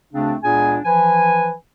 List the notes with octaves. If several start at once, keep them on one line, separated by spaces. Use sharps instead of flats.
D2 C#3 A3 C4 D4
C#2 A#2 B3 D4 G#4 G#5
E3 F3 B4 G#5